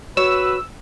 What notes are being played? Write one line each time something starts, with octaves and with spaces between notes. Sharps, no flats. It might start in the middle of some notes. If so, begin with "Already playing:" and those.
F#4 B4 C#5 E6